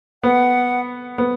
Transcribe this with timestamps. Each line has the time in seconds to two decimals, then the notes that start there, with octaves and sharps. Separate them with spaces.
0.23 B3 F#5
1.18 B3